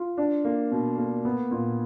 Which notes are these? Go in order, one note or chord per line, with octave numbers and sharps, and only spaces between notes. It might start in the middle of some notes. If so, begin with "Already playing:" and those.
Already playing: F4
D4
A#3
B2
A#3
B3
A#2